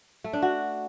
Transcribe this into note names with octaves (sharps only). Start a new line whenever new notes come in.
A3
D4
F#4